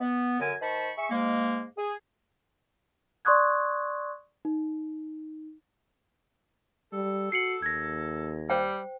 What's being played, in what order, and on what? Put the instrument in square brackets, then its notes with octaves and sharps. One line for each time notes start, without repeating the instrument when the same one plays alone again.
[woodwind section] B3
F#2 D3 A#4 G#5
D#3 C5 A5 B5 C#6
G#4 E5 C#6
G#2 G#3 A#3
G#4
[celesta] D5 C6 C#6 D#6 F#6 G#6
D#4
[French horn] G3 [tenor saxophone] A4
[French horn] F#4 [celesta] C7 C#7 F#7
[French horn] D#2 [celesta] G#6 A#6
[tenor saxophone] G3 [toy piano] C5 G5